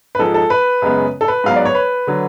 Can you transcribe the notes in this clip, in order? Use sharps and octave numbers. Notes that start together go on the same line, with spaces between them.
B4
G#2 F3 G#3 A4
A4
B4
F#2 C#3 G#3 B3
A4
B4
G#2 F#3 B3 F5
D5
C#5
B4
D3 F#3